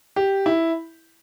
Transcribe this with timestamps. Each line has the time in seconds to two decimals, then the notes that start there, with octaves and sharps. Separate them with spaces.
0.16 G4
0.46 E4